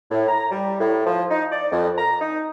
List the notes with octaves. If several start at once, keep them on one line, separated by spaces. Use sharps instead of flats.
A2
A#5
G3
A2
F3
D#4
D5
F2
A#5
D#4